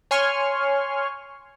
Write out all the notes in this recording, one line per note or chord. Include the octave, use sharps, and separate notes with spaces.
C#5 G#5 C6 C#6 F6